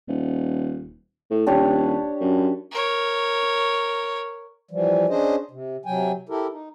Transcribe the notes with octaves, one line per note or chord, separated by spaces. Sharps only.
D#1
A2
D#1 D4 G4 C#5
F#2
A#4 C#5
E3 F3 G3
C#4 D4 G#4 C5 D#5
C3
C3 F#3 G5 G#5
E4 G4 A4 A#4
D#4